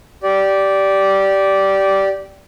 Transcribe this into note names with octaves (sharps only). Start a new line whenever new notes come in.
G4 D5